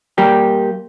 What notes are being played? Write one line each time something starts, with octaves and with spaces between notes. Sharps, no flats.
G3 A#3 G4